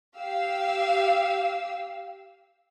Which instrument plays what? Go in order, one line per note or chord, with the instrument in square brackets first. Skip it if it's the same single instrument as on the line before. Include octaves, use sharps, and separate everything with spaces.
[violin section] G4 F5 E6